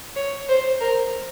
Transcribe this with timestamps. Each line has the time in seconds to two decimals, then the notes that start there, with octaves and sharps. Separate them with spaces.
0.16 C#5
0.49 C5
0.81 A#4